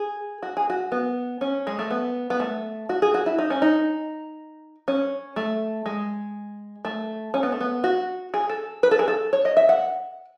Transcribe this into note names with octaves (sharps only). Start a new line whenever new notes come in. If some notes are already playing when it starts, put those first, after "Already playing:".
Already playing: G#4
F#4
G#4
F#4
B3
C#4
G#3
A3
B3
B3
A3
F#4
G#4
F#4
E4
D#4
C#4
D#4
C#4
A3
G#3
A3
C#4
B3
A3
B3
F#4
G#4
A4
B4
A4
G#4
A4
C#5
D#5
E5
F#5